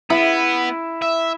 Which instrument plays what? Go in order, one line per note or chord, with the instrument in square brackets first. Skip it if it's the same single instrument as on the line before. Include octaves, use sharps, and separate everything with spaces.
[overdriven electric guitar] B3 [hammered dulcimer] E4
[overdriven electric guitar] E5